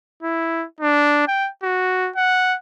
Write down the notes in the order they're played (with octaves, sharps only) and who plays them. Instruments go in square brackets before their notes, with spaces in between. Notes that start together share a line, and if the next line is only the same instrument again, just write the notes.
[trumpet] E4
D4
G5
F#4
F#5